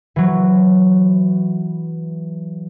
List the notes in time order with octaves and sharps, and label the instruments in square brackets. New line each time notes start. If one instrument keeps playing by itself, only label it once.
[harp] E3 F#3